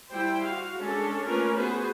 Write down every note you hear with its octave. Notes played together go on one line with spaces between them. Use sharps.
G3 E4 C5 G5
F#4 F5
G#3 C#4 D4 A4
A3 A#3 C#4 F4 A#4 B4
B3 F#4 G#4 B4 C5